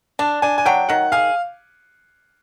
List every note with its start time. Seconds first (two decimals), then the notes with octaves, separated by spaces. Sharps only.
0.19 D4 A5
0.42 D4 G#5
0.58 G#5
0.66 F#3 G5
0.89 D#3 F#5
1.12 G#4 F5